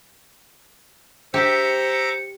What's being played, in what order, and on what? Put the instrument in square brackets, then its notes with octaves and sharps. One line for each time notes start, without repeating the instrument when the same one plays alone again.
[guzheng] G4 [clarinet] C5 [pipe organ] E5 A#5 D6 [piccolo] C#7